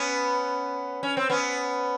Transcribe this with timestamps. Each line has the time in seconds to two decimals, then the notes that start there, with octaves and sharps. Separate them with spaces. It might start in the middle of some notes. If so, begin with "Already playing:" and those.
Already playing: B3 C#4
1.03 C#4
1.17 C4
1.30 B3 C#4